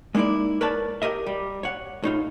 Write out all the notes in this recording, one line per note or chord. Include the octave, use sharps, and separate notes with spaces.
G#3 A#3 D#4 E4 D5
A#4 B4 C#5 D5 A5
G4 A#4 D#5 E5
G3
C#5 F#5
A2 D#4 F4